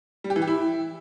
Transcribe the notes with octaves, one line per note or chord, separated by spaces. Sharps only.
G3
G4
E3
G4
E4